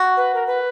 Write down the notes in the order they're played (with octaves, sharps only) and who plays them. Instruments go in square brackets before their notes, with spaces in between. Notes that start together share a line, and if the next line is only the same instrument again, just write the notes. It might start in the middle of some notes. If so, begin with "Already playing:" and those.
Already playing: [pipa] F#4
[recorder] B4
A#4
B4